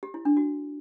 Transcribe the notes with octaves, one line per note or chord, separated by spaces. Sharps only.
G4
E4
D4
F#4